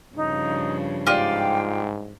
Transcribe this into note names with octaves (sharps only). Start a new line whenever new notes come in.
G2 C#3 F3 D#4
G#2 F4 G4 D5 F5 G5